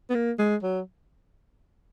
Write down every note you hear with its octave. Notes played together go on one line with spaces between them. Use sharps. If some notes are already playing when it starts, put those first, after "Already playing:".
B3
A#3
G#3
F#3